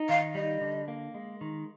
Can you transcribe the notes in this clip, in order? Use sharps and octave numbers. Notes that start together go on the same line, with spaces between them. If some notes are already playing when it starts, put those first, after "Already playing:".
Already playing: D#4
D#3 F5
G3 D#5
D3
A#3
G#3
D#3